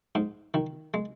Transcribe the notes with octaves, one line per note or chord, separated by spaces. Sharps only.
G#2
D#3
G#3